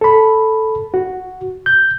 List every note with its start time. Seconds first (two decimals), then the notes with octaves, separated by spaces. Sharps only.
0.01 A4 B5
0.94 F#4
1.66 G6